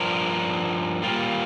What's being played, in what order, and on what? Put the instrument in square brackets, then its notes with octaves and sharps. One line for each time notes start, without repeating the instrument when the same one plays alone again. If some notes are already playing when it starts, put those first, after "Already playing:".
Already playing: [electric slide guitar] G2 F3 D4 A#4
A#2 G3 A#3 F4